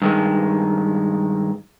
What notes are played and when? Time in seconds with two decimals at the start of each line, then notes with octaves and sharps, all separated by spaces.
0.02 G2 D#3 G#3